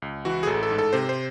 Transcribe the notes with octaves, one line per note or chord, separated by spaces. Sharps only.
C#2
E3 F#4
G#4
A1 A4
A4
G#2
A4
C3 C5
C5